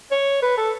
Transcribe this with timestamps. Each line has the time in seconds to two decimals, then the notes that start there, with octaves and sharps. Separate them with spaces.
0.12 C#5
0.43 B4
0.58 A4